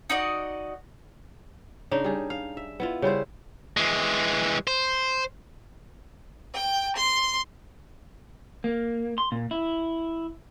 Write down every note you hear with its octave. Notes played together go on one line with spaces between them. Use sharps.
D#4 F#4 D5 D#5
C#3 D4 D#4
G3 G#4
F5
E5
B3 E4 F4
C#3 G3 E4 C5
E3 G#3
C5
G5
C6
A#3
C6
A#2
E4